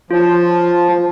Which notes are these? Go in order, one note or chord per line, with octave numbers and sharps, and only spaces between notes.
F3 F4 C#5 A5